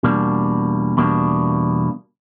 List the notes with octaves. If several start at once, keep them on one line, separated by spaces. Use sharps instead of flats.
E2 B2 G3 A#3 D4
E2 B2 G3 A#3 D4